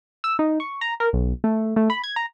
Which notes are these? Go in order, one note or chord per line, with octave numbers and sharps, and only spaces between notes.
E6
D#4
C#6
A#5
A#4
B1
A3
A3
B5
G#6
A#5